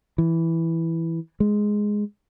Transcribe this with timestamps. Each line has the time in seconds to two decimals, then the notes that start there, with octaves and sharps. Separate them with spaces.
0.18 E3
1.40 G#3